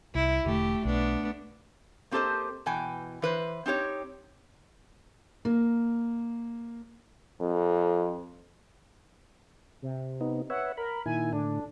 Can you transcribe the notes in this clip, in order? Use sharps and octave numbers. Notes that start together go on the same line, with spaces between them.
C2 E4
E1 D3 A3 G4
B1 A3 B3 D4
A#3 C4 G4 A4 C5 D#5
B2 E3 G5 G#5
E3 B4 C5
C4 D#4 G4 C#5
A#3
F2
C3
B3 D#4
B4 C#5 E5 F#5
A#4 B5
A#2 D#3 E4 G#5
A2 D3 D4